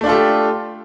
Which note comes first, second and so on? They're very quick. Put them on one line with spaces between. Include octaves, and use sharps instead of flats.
A3 D4 F4 A4 G4